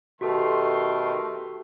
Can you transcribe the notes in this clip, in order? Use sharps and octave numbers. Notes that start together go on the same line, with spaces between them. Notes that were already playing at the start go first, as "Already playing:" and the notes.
B2 D#3 A3 F#4 G4 A4 C6